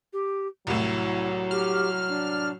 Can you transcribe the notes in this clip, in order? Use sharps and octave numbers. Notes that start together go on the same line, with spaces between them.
G4
C2 A2 F#3 E4
G4 F6
D4